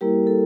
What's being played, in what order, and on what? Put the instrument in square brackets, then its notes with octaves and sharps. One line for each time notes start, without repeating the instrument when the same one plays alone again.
[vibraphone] G3 A#3 E4 G4 A#4
A4